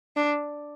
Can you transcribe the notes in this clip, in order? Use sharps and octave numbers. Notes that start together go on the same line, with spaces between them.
D4